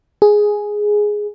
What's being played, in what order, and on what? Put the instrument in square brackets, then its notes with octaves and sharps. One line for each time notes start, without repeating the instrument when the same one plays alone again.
[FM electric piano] G#4